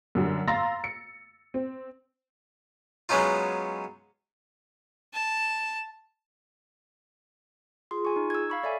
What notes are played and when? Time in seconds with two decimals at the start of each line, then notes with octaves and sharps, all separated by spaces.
0.15 F#2 D3 G3
0.48 F5 A#5 C6 E6 A6 A#6
0.84 C#7
1.54 C4
3.09 F#3 G#3 B3 C#4 D#4 F4
5.13 A5
7.91 F4 G#4 C6 D#6
8.05 G#5 C#6
8.16 D#4
8.30 E6 G#6
8.50 F5 B5 C#6
8.64 A4 C#5 D5 E5 G#5